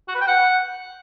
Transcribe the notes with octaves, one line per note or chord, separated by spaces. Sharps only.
F#4
B4
G5
F#5